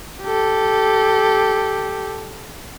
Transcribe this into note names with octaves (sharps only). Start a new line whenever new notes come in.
G4 A4